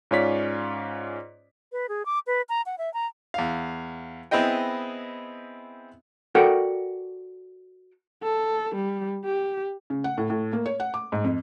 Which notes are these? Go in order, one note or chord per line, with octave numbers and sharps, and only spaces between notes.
G#2 C#4 F4 C#5 D5 B6
B4
G#4
D6
B4
A#5
F#5
E5
A#5
E2 F5
B3 C4 E4 G#4 D#5 G5
F#4 A4 A#4 D5 F#5 G5
A4
G3
G4
C#3
F#5
A2
A2
A#3
C#5
F#5
D6
G#2
F2